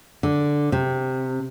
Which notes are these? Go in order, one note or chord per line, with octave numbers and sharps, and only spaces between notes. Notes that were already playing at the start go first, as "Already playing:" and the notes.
D3
C3